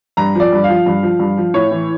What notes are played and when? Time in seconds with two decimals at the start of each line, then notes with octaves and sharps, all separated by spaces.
0.17 G2 A#5
0.35 F3 D5
0.52 G2
0.64 F5
0.69 F3
0.86 G2
1.03 F3
1.19 G2
1.38 F3
1.54 A2 C#5
1.71 E3